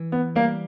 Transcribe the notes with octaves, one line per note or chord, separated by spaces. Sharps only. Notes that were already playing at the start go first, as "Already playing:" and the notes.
Already playing: E3
B3
G3 A#3